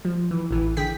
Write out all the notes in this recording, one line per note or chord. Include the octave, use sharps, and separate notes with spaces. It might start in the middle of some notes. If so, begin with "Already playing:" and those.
F3
E3
A1 E3
D3 G#4 G5 B6